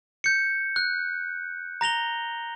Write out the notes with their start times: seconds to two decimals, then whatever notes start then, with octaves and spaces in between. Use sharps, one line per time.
0.24 G6 C#7
0.76 F#6
1.81 A#5 A#6 F7 G7